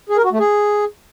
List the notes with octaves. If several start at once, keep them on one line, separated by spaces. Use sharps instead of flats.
G#4
A#4
F#4
A3
G#4